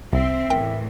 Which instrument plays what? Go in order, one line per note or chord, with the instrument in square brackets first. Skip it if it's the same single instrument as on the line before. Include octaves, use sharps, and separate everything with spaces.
[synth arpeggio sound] C2 [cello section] C4 [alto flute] E5
[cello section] E2 A2 E3 [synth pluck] A#4 G5